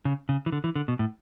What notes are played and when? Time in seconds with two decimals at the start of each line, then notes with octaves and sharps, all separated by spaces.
0.05 C#3
0.29 C#3
0.46 E3
0.52 D3
0.64 E3
0.75 D3
0.88 B2
0.99 A2